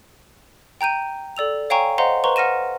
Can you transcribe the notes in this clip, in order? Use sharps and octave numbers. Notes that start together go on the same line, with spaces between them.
G5 A#5 G6 D#7
A4 D5 E6 F7
C#5 F5 G5 G#5 A#5 C#6
C5 D#5 F5 F#5 A#5 C6
B4 C5 A#5 C6 C#6
F#5 F6 A#6 D#7 E7